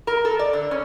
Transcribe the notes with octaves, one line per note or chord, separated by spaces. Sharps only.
A#4
A4
D5
D3
C#4